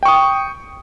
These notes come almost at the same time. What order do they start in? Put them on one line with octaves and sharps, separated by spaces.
G5 C#6 D#6